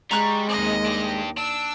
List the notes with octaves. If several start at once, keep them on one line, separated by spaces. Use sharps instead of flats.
G3 G#3 A#5 C#6 F#6
D#2 C4 G#4 D#5
D4 G4
D4 E6